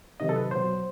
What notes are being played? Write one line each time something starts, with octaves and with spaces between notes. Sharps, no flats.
C3 D#3 F#3 D#5
A4
B4
B2 F#3 C5